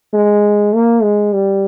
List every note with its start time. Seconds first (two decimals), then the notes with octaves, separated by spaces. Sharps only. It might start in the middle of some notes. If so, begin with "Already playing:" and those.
0.14 G#3
0.74 A#3
1.03 G#3
1.33 G3